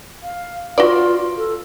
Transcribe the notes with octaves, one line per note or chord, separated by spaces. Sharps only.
F5
F4 F#4 B4 D5
A4